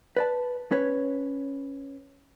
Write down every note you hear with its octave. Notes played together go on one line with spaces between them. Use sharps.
B4 D5 A5
C#4 B4 C#5